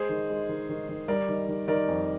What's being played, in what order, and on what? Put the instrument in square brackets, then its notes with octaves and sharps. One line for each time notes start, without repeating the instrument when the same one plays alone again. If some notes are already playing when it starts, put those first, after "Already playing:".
Already playing: [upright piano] G#3 [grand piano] G#4 C5
[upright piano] D#3
G#3
D#3
D#3
D#3
[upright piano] G3 [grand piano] A#4 D5
[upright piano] D#3
D#3
[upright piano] D#3 [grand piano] A#4 D5
[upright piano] F2